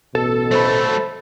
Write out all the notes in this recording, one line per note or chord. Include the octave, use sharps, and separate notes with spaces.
A1 B2 A4
F#3 A3 C5 B5